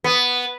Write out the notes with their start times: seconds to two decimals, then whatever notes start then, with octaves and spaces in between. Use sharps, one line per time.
0.04 B3